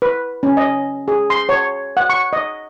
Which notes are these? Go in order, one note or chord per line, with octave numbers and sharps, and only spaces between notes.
B4
C#4
D#5
G#4
C6
C#5
F#5
C#6
D#5